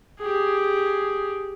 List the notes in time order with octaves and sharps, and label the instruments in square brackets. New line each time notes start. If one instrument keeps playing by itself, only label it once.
[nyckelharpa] G4 G#4